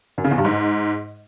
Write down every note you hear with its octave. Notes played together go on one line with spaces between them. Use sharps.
F#2
C#3
E2
G2
G#2